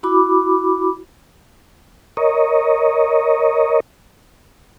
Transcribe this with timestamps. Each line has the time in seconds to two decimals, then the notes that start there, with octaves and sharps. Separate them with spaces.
0.03 E4 F#4 B5 D6
2.17 A#4 C#5 D#5